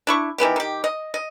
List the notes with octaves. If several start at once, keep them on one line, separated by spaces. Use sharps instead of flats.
D4 E4 C#6
D#3 E3 B3 G4
D#3 G4
D#5
D#5